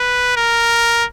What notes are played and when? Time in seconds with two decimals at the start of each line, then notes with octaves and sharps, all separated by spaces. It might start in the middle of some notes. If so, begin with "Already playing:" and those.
Already playing: B4
0.37 A#4